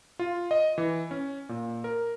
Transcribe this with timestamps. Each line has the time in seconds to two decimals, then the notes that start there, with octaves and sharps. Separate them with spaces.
0.19 F4
0.51 D#5
0.78 E3
1.11 C#4
1.49 A#2
1.84 A#4